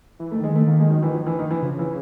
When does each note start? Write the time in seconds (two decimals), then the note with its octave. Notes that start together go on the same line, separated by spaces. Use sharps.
0.19 E3
0.32 D#3 A3
0.44 G#3
0.51 D#3 A3
0.66 D#3 A#3
0.79 G#3
0.90 F#3
1.03 E3
1.14 F3
1.27 E3
1.39 D#3
1.51 E3
1.62 C#3 F3
1.79 E3